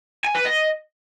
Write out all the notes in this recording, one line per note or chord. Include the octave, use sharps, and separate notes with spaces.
G#5
B4
D#5